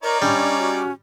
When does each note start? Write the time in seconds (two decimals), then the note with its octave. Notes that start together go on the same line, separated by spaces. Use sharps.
0.03 D#4 A#4 C#5 D5 A#5
0.22 G3 C#4 D4
0.59 F#4